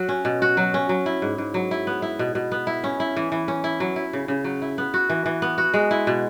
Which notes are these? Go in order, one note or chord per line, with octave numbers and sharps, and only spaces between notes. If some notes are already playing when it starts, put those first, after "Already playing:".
Already playing: F#3 F#4
C#4
B2
F#4
F#3
C#4
F#3
E4
G#2
G#2
F#3
E4
B3
E4
B2
B2
B3
E4
C#4
E4
E3
E3
C#4
E4
F#3
E4
C#3
C#3
F#3
E4
B3
F#4
E3
E3
B3
F#4
G#3
E4
B2